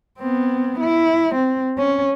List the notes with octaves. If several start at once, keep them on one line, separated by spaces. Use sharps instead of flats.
B3 C4
E4
C4
C#4